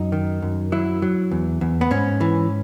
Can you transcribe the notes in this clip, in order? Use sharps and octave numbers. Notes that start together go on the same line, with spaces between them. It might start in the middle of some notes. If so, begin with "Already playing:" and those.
Already playing: F#2 D#4
D#3
F#2
F#3 E4
F#3
E2
E2
B3
G#2 C#4
E3